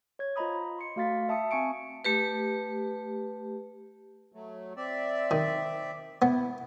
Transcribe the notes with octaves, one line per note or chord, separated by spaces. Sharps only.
C#5 G#6
F4 C5 D#5 A#5 B5 D#6
C6 C#7
A3 F#4 F5 C6 A6 B6
E5 A5 D#6 C#7
C4 G#5 C#6 C#7 D7
A3 G4 B4
F#3 A3
C4 D5 E5
D#3
B3 E4